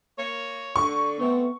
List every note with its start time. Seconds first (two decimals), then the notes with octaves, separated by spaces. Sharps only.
0.19 A#3 C#5
0.76 D3 C#6
1.19 A3 B3 C4